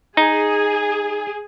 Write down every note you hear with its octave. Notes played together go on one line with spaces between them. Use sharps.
D#4 G#4